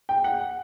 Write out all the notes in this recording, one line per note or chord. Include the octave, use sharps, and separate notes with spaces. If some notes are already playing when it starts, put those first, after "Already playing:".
G5
F#5